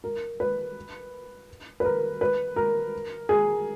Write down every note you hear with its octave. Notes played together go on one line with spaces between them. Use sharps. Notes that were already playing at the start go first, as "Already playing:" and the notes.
A#4
B4
B4
A#4
B4
A#4
G#4